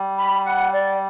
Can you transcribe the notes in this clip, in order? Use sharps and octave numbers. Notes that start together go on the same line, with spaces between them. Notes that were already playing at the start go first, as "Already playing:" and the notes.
Already playing: G3
B5
F#5
D5